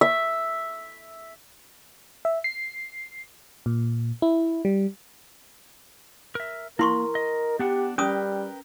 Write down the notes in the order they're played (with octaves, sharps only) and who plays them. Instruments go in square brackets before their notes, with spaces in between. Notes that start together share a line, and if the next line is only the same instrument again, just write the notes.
[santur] E5
[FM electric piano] E5
C7
A#2
E4
G3
[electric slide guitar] A#4 E5
[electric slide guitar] A#3 [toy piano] E4 C6 C#6 [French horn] A#4
[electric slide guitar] D#5
[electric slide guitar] B3 D4 F#5 [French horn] G4
[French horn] G3 [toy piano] C#4 D#6 [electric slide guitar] A#4 B4 G5